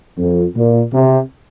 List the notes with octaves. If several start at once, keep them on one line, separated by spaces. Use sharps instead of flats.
F2
A#2
C3